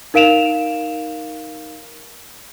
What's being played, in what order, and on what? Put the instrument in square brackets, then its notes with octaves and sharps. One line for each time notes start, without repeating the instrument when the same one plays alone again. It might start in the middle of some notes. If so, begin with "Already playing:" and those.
[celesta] D#4 A#4 F5 D7 E7 F7